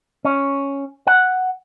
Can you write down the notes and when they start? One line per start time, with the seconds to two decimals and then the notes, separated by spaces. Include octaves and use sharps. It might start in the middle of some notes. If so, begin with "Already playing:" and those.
0.25 C#4
1.07 F#5